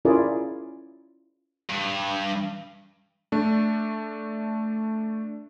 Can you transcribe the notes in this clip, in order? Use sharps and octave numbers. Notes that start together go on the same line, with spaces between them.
C#4 E4 F4 G#4 A#4 D5
G2
A3 D4